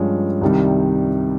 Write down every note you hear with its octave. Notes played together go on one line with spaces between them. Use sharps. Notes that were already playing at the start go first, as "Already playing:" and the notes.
Already playing: G2 F3 G#3 C#4
C2 C3 D#3 G3